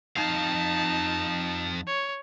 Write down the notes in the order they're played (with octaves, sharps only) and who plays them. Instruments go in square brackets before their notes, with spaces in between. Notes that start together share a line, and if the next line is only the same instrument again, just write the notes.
[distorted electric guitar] F2 F5 [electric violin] D#4 A5
[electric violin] C#5